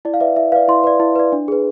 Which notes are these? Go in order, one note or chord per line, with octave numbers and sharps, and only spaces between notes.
E4 D5
F5
B4 D5 E5
E4 E5
B4 D5 F5
E4 C6
B4 D5
E4
B4 D5
D4
G#4 B4